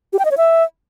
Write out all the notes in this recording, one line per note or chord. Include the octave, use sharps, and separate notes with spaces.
G4
G5
D#5
C#5
E5